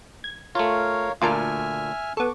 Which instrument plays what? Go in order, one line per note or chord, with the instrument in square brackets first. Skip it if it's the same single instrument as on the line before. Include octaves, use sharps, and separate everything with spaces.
[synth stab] G#6
[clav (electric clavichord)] A3 F4 [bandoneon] A#4 C#5 F5
[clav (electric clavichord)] D2 A#2 A5 [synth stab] F4 A#4 [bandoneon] E5 G#5 F6
[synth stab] B3 A4 [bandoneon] C#6 D6